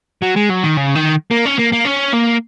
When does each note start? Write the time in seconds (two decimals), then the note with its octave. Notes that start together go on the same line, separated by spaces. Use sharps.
0.23 F#3
0.37 G#3
0.50 F#3
0.63 D#3
0.77 C#3
0.95 D#3
1.31 A#3
1.46 C#4
1.59 A#3
1.73 A#3
1.86 C#4
2.14 A#3